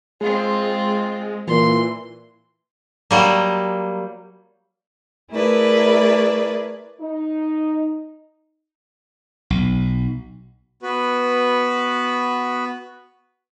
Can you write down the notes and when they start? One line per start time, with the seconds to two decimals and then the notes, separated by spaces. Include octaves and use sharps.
0.21 G#3 C4 F4 G#4
1.48 A#2 E3 C6
3.11 F#3 G3 A#3
5.31 A3 E4 G#4 A#4 B4 D5
7.00 D#4
9.50 B1
10.83 B3 F#4 B4